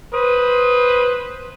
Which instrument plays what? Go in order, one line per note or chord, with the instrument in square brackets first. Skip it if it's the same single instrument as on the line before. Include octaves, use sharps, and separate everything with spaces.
[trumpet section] B4 C5 D#6